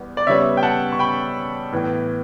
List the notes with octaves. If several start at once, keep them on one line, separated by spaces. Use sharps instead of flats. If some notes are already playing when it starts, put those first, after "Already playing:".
Already playing: E2 G3 B3
D5
C#3 G3 B3 C#5 E5
G5
F#5 A5
C#6
G5 B5
A2 E3 B3